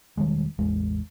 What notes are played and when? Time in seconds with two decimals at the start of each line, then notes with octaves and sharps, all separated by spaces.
0.17 E1 D#3 G3 G#3
0.58 A1 E2 G#3